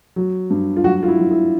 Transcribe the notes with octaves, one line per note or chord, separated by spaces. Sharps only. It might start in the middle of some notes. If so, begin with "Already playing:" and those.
F#3
G2
F4
F#3 F#4
F4
E4
F#3
E4